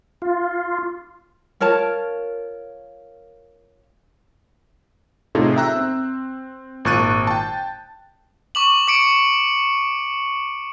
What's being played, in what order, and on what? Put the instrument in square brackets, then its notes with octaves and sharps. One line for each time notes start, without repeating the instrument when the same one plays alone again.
[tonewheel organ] F4
[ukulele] F4 A#4 C#5 A5
[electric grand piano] A2 C3 D#4 F4 G#4 A4
E5 G5 A#5 E6 F#6
C4
G#1 A#2 C#6 F#6 A6 D#7
G5 A5
[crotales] C#6 D6 F#7
D6 C#7 D7